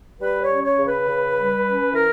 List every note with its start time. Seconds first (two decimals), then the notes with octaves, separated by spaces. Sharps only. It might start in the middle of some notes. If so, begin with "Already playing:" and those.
0.21 G3 B4
0.42 C#5
0.50 C#4
0.64 C#5
0.78 C#3
0.86 B4
1.07 C#3
1.36 G3
1.65 C#4
1.93 E3 A#4